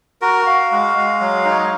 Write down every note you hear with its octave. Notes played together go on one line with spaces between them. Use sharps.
F#4 A#4
F#4 F5
G#3
G#3
F#3
D#4
C#5
D#5